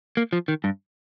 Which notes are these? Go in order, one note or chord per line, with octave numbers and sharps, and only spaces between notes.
A#3
F3
D#3
G2